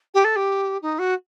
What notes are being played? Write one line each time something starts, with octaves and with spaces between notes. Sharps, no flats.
G4
A4
G4
D#4
F#4